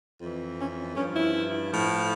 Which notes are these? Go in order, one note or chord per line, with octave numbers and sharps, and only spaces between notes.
F2 E3
C#4
G2 F3 C#4
E4
A2 F3